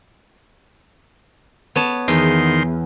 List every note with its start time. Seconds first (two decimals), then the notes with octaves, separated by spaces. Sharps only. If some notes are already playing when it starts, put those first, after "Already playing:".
1.76 B3 C#5 A5
2.08 E2 D#3 C6